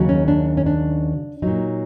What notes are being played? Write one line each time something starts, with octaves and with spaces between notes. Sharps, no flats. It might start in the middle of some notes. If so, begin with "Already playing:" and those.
Already playing: D#2 C#3 F#3
C#4
D4
C#4
D4
A#2 F#3 D#4